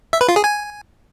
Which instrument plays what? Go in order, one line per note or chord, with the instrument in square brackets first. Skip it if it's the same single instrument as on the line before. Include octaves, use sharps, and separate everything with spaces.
[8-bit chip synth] E5
B4
F4
G#4
G#5